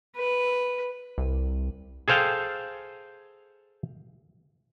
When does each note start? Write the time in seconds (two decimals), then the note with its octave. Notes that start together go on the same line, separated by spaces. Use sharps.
0.16 B4
1.18 C2
2.08 G#4 A4 C5 F5 G5